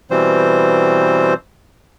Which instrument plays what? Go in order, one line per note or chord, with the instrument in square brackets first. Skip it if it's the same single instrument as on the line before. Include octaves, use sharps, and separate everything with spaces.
[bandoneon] B2 E3 G3 C4 C5